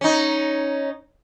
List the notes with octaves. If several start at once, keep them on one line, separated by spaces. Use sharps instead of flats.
C#4 D#4